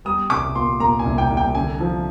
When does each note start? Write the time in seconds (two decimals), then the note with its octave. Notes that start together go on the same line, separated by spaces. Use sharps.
0.05 G3 D#6
0.30 C2 D6
0.55 A#2 C6
0.80 A#2 A#5
0.99 G#5
1.05 C2
1.18 G5
1.30 C2
1.37 G5
1.55 D3 G#5
1.80 F3